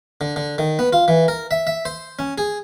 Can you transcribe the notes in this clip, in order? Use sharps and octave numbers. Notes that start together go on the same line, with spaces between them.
D3
D3
D#3
B3
F4
E3
A#4
E5
E5
C5
C#4
G#4